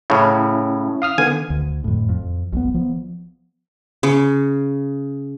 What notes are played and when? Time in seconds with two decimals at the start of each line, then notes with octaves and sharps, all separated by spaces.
0.10 A2 C#3 C#4 E4
1.02 F5 D#6 F6
1.18 D3 D#3 B3 G#5
1.50 D2
1.84 F2 A2
2.09 F2
2.53 B1 F#3 B3
2.74 F3 B3
4.03 C#3